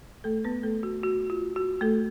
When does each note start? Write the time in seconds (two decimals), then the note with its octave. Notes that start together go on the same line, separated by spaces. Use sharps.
0.24 A3 A4
0.45 B3 B4
0.63 A3 A4
0.83 F#4
1.03 F#4
1.30 F4
1.56 F#4
1.81 A3 A4